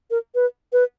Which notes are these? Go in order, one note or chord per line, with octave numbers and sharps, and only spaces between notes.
A#4
B4
B4